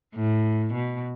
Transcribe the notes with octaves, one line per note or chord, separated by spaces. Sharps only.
A2
B2